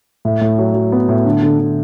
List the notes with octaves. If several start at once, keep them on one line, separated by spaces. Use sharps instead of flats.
A2
A2
F#3
F#3
B3
A2
D3
D3
D3